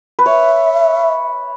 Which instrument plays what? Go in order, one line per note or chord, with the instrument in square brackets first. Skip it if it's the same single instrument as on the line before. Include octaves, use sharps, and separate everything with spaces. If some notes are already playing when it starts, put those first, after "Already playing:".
[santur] B4
[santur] C#5 [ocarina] E5